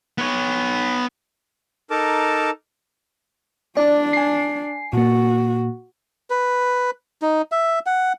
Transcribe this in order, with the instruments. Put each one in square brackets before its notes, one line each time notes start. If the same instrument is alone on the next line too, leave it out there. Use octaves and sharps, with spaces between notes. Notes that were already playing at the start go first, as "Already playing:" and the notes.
[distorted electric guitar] B3 C#5
[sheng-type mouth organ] D#4 A4 A#4 A5 D6
[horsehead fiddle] D4 [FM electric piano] D5
[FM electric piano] G#5 C7
[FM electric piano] A#2 A#3 [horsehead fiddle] F#4
[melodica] B4
D#4
E5
F#5